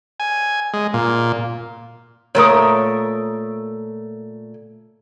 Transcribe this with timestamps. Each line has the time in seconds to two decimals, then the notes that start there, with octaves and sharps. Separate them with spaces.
0.20 G#5
0.73 G#3
0.94 A#2
2.35 A#2 A3 A#4 C#5 D#6